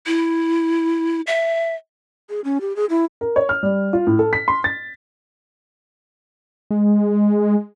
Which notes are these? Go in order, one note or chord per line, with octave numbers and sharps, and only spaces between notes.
E4
E5
G#4
C#4
G4
G#4
E4
A#4
C#5
F6
G3
F4
A2
A4
B6
C6
A6
G#3